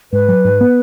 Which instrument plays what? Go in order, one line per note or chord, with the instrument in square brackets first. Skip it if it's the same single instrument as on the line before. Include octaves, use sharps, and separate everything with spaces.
[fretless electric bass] G#2 [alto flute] B4
[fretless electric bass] F#3
G#2
B3